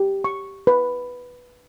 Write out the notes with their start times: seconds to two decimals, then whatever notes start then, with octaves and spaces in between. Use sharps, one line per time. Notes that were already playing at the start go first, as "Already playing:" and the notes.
Already playing: G4
0.24 C#6
0.67 B4